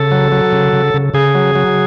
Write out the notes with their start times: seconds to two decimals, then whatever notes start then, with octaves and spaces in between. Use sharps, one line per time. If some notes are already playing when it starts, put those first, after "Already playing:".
Already playing: C#3 A4
0.11 F#3
0.32 F#3
0.53 C#3
0.73 C#3
0.94 C#3
1.14 C#3 G#4
1.35 F#3
1.55 F#3